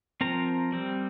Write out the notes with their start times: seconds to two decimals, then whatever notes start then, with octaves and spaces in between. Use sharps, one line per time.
0.21 F3 C4 A#4 A#5
0.72 G3 C4